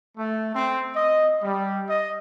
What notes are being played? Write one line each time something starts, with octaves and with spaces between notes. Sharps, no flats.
A3
C4
D#5
G3
D#5